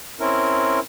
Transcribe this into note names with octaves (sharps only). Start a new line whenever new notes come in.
C4 C#4 E4 A#4